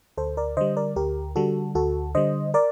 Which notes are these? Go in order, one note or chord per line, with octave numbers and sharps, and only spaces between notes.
D2 A4 C5
A#4 D5
D3 G3 C5 D#5
A#4 D5
D2 G4 A#4
D3 G3 F#4 A4
D2 F#4 A4
D3 G3 C5 D#5
A#4 D5